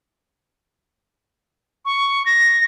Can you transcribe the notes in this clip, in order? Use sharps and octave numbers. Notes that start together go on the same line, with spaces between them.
C#6
A#6